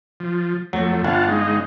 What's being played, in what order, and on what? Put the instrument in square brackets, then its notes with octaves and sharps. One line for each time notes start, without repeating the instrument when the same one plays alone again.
[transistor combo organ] F3
[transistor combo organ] F2 A3 [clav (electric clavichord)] F#3
[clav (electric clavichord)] G1 [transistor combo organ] F4 F#5 A5
[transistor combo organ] G#3 D#4